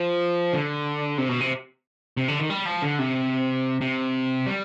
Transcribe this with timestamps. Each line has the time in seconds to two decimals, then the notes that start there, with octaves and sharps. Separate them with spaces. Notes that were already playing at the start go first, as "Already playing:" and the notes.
Already playing: F3
0.53 D3
1.18 C3
1.29 B2
1.41 C3
2.17 C3
2.28 D3
2.39 D#3
2.50 G3
2.66 F3
2.82 D3
2.99 C3
3.81 C3
4.46 G3